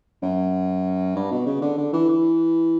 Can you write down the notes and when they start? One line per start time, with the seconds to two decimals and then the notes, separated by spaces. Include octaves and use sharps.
0.22 F#2
1.15 G2
1.31 B2
1.46 C#3
1.62 D3
1.78 D3
1.93 E3
2.09 E3